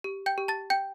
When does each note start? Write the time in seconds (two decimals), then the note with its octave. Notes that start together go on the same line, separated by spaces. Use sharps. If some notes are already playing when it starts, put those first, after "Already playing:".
0.04 G4
0.26 G5 G6
0.38 G4
0.48 A5 A6
0.70 G5 G6